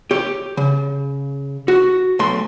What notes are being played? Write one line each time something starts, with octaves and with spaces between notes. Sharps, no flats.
G4 C#5
C#3
F#4
B1 A3 C6